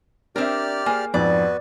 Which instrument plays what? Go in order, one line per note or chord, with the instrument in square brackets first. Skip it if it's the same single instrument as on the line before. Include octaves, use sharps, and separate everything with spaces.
[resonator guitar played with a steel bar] C4 A#4 [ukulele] D4 E5 [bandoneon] G4 D5 F6
[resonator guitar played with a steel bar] A#3 [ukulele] G#4 C5 G#5
[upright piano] F2 G#2 [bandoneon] B3 F#4 B4 [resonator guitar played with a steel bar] D5